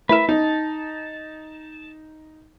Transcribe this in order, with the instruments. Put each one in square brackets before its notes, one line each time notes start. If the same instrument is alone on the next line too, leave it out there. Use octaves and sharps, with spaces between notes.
[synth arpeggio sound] A3 E4 A#4 [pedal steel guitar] B4 E5
[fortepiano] D#4 [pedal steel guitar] A5